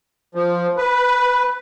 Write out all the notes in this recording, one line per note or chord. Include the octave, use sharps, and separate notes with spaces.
F3
B4